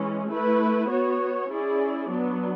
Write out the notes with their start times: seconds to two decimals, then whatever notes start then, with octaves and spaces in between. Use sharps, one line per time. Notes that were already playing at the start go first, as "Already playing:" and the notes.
Already playing: E3 G#3 C#4
0.28 A3 E4 B4
0.89 B3 F#4 C#5
1.49 C#4 E4 G#4 D5
2.10 F#3 B3 D4